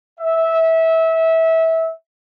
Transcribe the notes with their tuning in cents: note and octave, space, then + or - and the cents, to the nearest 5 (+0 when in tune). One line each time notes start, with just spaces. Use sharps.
E5 -20